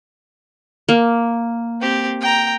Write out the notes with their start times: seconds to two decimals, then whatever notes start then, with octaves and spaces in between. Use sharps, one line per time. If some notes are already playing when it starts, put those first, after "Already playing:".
0.89 A#3
1.81 C4 G4
2.21 G5 A#5